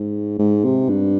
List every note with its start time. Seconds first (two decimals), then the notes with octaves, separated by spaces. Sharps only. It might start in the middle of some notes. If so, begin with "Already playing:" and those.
Already playing: G#2
0.39 G#2
0.65 C3
0.89 G2